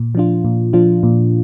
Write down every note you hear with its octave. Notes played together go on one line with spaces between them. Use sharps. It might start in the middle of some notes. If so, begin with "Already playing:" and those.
Already playing: A#2
F3 D4 F4
A#2
F3 D4 F4
A#2